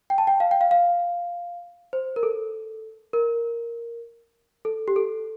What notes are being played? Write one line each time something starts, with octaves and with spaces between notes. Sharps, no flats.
G5
A5
G5
F5
G5
F5
F5
C5
A#4
A4
A#4
A4
G4
A4